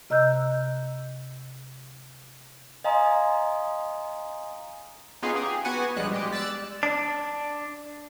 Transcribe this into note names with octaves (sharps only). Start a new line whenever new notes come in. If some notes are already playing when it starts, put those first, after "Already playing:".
C3 D#5 A#5 E6 F#6 G6
D#5 F5 G#5 A#5 C6 D#6
B3 C#4 D#4 F4 G#4 F5
G4 G#4
B3 F#4 B4 F#5 G#5
A#1 G3 G#3 F#6
G#3 G4
D5 E6 F#6 A6
D4